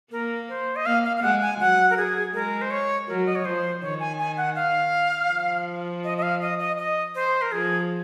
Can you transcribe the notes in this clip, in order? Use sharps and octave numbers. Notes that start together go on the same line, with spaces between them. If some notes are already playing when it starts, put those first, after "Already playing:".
A#3 A#4
C5
D#5
A#3 F5
F5
F5
G#3 F#5
G#5
F#3 F#5
A#4
G#4
G#3 A#4
C5
C#5
F#3 A#4
D#5
C#5
F3 C5
D#3 C#5
G#5
G#5
F#5
F5
F3
D#5
D#5
F5
D#5
D#5
D#5
C5
A#4
F3 G#4